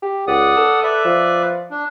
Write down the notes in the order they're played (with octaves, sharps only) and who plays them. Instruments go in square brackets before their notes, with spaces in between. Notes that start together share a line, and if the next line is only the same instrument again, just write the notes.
[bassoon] G4
[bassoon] C#2 [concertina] D5 F#5 D#6
[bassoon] A4
[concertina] B4 D5 E5
[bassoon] F3
[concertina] D4